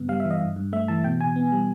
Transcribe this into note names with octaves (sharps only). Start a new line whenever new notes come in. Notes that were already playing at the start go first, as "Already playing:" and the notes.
Already playing: G2 C#3 B3
G3 F5
E5
E3
D#5
G2
G2
A3 E5
E3 A5
B2 G5
B2 G#5
B3
G3